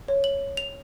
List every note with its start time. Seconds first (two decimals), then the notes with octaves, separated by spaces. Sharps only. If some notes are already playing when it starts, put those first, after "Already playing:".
0.08 C#5
0.24 F#7
0.57 F7